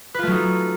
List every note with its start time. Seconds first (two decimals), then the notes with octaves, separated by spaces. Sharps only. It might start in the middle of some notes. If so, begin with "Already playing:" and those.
0.14 B4
0.19 F4
0.23 A3
0.27 F#3
0.31 D#4